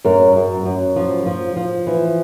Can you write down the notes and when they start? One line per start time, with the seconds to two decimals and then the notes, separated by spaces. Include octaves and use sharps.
0.05 F#2 A#4
0.36 F#2
0.66 F#2
0.96 F3
1.26 F3
1.56 F3
1.87 E3